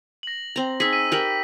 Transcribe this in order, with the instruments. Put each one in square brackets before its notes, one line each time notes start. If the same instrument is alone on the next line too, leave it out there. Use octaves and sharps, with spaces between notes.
[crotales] A#6 F#7
[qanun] C4 A#5
[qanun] D#4 G#4 [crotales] E6 B6
[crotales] E6 B6 D#7
[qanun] G4 A#4 B5